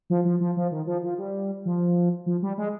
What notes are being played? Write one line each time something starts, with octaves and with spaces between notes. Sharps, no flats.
F3
F3
F3
F3
D#3
F3
F3
G3
F3
F3
G3
G#3